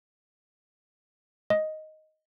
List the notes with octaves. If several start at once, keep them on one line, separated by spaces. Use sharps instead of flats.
D#5